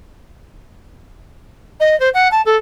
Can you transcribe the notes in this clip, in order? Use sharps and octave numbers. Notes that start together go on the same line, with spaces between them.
D#5
C5
F#5
A5
A4